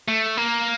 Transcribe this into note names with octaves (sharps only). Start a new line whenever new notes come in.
A3
A#3